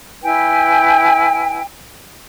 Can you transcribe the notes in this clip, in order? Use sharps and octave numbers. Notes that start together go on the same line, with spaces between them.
E4 B4 G5 G#5